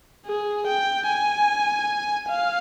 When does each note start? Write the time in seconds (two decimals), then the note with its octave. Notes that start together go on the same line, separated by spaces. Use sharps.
0.26 G#4
0.67 G5
1.08 G#5
2.29 F5